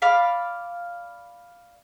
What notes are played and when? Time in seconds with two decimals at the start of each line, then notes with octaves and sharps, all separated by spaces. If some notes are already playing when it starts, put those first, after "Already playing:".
0.02 D5 F5 B5